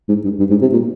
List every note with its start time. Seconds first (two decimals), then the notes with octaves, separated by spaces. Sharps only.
0.08 G#2
0.25 G2
0.39 G2
0.50 G#2
0.61 C3
0.72 A#2